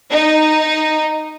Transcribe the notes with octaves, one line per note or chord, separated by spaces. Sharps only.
D#4